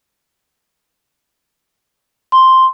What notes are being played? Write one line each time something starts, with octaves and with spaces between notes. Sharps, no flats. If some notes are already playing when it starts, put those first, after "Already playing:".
C6